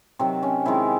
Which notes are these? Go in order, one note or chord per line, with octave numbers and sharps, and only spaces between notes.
C3 D#3 F#3 C4
C#4
C3 D#3 G#3 E4